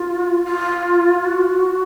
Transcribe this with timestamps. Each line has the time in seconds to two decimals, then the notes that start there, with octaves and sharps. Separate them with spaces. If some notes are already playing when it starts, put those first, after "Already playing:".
Already playing: F4
0.44 F4
1.22 F#4